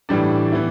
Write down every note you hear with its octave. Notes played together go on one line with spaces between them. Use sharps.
A2 E3 G3 D4
E3 B3 E4